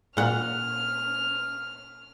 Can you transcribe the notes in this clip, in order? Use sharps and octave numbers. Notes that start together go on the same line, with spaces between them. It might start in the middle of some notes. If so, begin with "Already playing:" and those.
A#2 F#5 F6